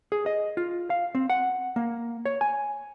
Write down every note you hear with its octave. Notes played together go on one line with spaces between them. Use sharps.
G#4
D#5
F4
F5
C4
F#5
A#3
C#5
G#5